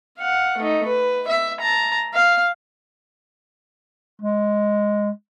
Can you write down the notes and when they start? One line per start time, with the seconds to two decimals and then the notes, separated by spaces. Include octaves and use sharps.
0.18 F5 F#5
0.58 A3 D#4
0.86 B4
1.27 E5
1.60 A5 A#5
2.14 F5
4.22 G#3